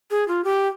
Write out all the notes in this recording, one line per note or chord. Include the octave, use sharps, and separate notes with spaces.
G#4
F4
G4